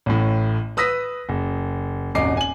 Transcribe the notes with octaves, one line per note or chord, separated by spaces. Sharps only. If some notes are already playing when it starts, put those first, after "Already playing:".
A1 A2
B4 D#6 E6 A#6 B6
F#1
D#1 G#1 F#2 D#5 D6 C7
G#5 F#7